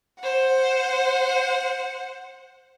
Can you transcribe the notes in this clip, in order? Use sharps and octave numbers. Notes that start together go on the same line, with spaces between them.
C5 F#5